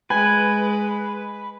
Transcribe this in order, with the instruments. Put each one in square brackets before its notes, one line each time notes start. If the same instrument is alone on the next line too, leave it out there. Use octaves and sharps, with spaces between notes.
[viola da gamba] G#3 [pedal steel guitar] B4 [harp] G#5